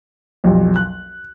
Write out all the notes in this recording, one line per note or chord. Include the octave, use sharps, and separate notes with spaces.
B1 F2 G3
F#6